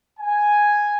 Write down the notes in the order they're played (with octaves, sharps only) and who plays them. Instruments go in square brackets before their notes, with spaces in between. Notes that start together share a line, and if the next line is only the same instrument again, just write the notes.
[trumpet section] G#5